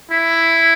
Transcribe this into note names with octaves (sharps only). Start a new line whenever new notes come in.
E4